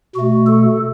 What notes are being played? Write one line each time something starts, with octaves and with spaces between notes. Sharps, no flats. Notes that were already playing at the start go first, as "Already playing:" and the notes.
B2 A3 F#4
A4